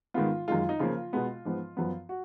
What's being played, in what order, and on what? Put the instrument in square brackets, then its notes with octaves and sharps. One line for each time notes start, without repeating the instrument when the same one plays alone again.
[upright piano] G#2 D#3 G#3 B3 F4
F#2 D#3 G#3 F4
F4
D#4
C#3 F3 A#3 F4
B2 G#3 B3
G#2 F3 G#3 B3
F#2 F3 B3
F#4